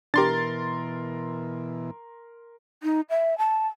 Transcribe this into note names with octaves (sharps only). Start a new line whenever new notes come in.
B2 E3 D4 G4 A#4 C6 A6
D#4
E5
A5